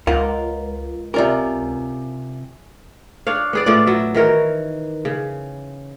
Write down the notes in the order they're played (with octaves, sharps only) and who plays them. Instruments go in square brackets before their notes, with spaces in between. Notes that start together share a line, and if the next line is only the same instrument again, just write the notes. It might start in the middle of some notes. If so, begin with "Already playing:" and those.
[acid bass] C#2 [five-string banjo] F4 [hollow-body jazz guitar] A#4 F#5
[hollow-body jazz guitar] C3 F4 A#4 [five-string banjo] C#4 D5
[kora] D4 C#5 F5
B3 G#4 D5
A2 B3 F4 D5
F#3 E5
D#3 E3 A#4 C#5
C#3